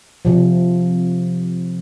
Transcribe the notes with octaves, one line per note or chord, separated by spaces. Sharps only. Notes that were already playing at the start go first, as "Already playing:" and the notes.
C3 F3